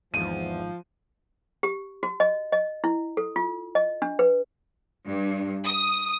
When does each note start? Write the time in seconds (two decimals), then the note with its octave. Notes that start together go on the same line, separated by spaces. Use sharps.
0.14 G#1 E2 G#2 F3 D#7
1.63 G4
2.03 F#4
2.20 D#5
2.52 D#5
2.84 E4
3.17 A4
3.36 F4
3.75 D#5
4.02 D4
4.19 B4
5.07 G2
5.67 D#6